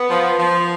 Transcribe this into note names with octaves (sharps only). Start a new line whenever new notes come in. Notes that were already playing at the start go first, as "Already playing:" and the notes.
Already playing: B3
F3
F3